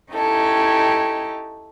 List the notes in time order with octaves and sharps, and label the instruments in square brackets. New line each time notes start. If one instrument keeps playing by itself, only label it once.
[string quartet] C#4 D#4 E4 G4 A4